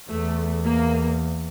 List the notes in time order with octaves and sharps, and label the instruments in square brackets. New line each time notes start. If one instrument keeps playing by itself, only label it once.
[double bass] E2 [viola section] A3
[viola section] A#3